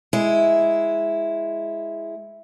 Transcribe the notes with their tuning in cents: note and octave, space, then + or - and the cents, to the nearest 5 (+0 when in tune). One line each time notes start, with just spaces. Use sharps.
G#3 +0 E4 +0